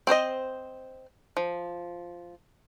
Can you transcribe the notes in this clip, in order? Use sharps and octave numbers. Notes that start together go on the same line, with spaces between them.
C4 C5 C#5 D#5
F3